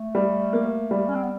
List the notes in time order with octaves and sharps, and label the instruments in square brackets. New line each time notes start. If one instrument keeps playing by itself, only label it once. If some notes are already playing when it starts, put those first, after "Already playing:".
Already playing: [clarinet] A3
[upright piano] G3
A#3
G3
[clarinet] C#4
C4
B3